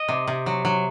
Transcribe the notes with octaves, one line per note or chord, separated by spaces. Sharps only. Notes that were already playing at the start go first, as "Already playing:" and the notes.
Already playing: D#5
C3
C3
F#3
F#3